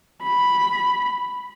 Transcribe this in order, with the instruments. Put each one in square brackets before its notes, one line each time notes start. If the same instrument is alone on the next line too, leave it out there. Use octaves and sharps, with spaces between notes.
[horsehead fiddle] B5